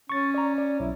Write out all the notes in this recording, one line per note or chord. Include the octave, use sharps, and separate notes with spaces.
C#4 C#6 A6
D5 A#5
D5
B1 E4